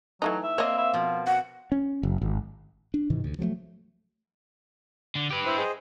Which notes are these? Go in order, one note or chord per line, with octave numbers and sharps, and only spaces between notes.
E3 F#3 A3 D#4
E5
A#3 C4 C#5 D#5
E5
B2 F3
F#4 F#5
C#4
F#1
G#1
D4
G#2 C3 D#3 E3
D2
F3 F#3 G#3 A3
D3
G4 B4
E4 C5
G#4 C5 D#5